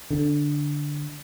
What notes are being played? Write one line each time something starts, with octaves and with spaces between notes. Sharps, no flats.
D3